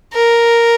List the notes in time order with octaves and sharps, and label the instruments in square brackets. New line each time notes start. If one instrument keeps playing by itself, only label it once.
[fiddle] A#4